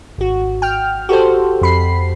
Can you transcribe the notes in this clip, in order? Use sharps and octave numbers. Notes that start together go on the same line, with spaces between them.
G#1 F#4
G5 F6
F#4 G4 A4 C5
F2 B5 C7